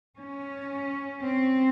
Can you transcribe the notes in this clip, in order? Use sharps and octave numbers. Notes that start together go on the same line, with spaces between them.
C#4
C4